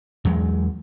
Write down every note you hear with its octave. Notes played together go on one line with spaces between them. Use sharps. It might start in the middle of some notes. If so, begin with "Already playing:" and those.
E2 F#3 G#3